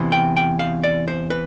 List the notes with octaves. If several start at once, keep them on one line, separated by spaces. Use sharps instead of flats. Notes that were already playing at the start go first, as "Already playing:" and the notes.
Already playing: E2 C3 E3
G5
G5
F5
D5
C5
B4